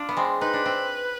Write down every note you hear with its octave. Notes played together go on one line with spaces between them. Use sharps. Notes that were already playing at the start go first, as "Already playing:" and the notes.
Already playing: D4 F4
B3
G#3 C4
D#4 B4
D4
C4